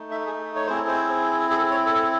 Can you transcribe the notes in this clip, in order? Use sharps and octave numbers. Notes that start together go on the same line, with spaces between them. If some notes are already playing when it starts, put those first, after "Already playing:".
Already playing: A3 D#4
E5
G#4
C#5
C4 E4 G#4 C5
A4
C5
G#4
A4
C#5
A4